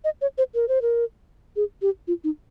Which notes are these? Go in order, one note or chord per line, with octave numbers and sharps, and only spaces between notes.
D#5
C#5
C5
A#4
C5
A#4
G#4
G4
F4
D#4